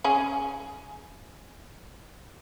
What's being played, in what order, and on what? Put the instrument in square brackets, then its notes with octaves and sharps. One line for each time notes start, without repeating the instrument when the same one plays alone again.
[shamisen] C#4 G#4